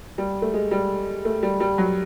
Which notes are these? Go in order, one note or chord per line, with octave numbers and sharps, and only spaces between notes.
G3
A3
G#3
G3
A3
G3
G3
F#3